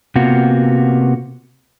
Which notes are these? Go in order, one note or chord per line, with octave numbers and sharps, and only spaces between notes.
C3 A#3 B3 F4 F#4